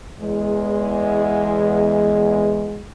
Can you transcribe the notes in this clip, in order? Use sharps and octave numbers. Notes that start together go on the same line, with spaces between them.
E2 G#3